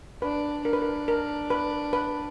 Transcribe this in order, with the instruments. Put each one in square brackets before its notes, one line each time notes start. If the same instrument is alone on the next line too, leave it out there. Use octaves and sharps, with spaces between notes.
[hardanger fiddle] D4 [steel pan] B4
[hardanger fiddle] D4 [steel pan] A#4
[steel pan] B4
A#4
A#4
B4
B4